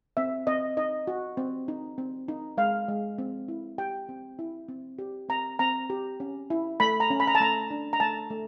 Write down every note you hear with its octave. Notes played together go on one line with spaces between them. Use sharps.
C4 E5
C4 D#5
D#4 D#5
F#4
C4
D#4
C4
D#4
G#3 F5
G#3
C4
E4
G4 G5
C4
E4
C4
G4
C4 A#5
C4 A#5
G4
C#4
E4
A3 B5
A#5
C#4
B5
A#5
A5
A3 A#5
D4
A#5
A3 A5
A3